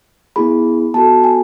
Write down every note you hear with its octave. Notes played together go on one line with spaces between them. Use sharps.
B3 E4 G#4 B5
B3 F#4 A4 A5
G#5